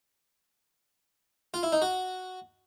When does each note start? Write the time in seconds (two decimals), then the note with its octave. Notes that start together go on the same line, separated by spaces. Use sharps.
1.54 F4
1.63 E4
1.72 D#4
1.82 F#4